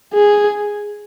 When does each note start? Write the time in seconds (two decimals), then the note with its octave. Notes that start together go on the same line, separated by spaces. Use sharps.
0.13 G#4